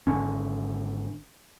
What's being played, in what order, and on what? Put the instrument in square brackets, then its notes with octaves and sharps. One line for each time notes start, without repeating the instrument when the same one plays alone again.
[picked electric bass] G#1 D3 C#4